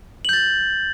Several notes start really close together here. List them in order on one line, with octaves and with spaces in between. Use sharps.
F#7 G6 A6